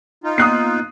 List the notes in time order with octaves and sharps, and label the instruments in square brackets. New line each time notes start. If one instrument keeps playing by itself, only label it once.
[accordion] D#4 F4
[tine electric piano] A#3 B3 [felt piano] D#6 F#6 C7